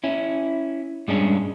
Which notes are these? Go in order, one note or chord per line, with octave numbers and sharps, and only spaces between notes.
C#4 E4
G2 G#3 C#4 D4